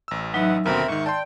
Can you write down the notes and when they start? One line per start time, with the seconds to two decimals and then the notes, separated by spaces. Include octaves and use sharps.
0.08 A1 E6
0.34 F#3 D#4 B4 E5 F#5
0.66 D#2 B2 D3 C4 A#4 E5 B5
0.88 G#2 D#3 C#6
1.06 D5 G5 A5 C6